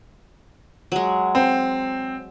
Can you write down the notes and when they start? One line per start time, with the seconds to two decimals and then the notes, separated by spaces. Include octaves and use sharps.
0.92 F#3 G#3
1.35 C4